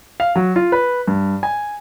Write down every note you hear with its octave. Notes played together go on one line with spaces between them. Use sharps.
F5
F#3
F4
B4
G2
G#5